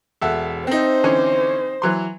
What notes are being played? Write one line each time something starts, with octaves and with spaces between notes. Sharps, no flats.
E1 A4 E5 F#5
C4 D#4 C5
D3 E3 C#4
E3 F#3 C6